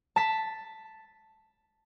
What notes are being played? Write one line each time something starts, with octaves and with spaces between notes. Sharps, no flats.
A5 B6